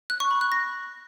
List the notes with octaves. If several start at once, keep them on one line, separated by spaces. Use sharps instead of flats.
F#6
C#6
B5
F#6
A#6